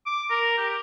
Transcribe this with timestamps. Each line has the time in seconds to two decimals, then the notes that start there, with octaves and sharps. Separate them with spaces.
0.06 D6
0.30 A#4
0.58 G4